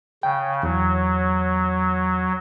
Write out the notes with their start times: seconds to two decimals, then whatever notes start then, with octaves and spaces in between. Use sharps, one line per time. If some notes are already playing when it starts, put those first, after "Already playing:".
0.23 C#3 G5
0.63 E2 F#3